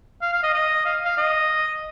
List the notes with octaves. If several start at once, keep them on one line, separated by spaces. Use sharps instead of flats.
F5
F5
D#5
D#5
F5
F5
D#5